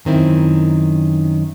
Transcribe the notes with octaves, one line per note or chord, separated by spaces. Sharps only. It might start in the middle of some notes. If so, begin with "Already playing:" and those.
F#2 D#3 C4 E4